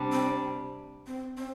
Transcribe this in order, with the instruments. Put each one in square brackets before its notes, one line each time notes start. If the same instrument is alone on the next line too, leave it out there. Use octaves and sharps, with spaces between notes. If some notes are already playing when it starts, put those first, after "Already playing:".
Already playing: [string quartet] C3 G3 D4
[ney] C4
C4
C4